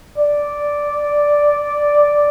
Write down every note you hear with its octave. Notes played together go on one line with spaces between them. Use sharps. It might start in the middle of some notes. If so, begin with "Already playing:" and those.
D5